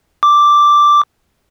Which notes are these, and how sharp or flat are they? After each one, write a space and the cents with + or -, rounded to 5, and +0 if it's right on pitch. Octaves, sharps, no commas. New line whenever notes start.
D6 +0